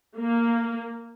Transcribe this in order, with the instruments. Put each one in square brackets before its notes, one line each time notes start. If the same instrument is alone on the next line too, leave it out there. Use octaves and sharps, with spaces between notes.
[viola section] A#3